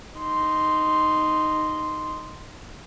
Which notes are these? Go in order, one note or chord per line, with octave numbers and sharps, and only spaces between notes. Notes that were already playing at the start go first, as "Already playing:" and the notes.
D#4 C6